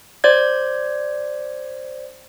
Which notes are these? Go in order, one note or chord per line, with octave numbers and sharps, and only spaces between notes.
C5 D5 G#6